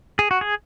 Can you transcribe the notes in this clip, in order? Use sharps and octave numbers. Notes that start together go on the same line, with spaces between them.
G#4
F#4
G#4